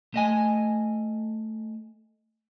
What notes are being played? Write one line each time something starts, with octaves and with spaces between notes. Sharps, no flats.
A3 D#5 G#5